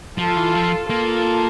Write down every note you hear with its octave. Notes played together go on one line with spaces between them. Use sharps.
F3 F4 A4
E3
F3
A#3 F4 A4